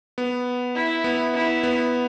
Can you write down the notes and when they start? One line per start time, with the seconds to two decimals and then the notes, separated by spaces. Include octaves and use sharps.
0.18 B3
0.75 E4
1.04 B3
1.34 E4
1.63 B3